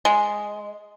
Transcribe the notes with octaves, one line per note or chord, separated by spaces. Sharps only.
G#3